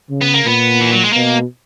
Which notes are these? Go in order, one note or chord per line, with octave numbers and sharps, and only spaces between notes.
C#3
B3
A#3
A#2 B3
E3
F#3
G#3
B2 A#3